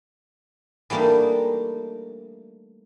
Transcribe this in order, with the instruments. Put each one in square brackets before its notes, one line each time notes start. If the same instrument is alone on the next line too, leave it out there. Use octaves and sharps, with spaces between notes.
[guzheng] E3 G3 A3 A#3 D4 D#4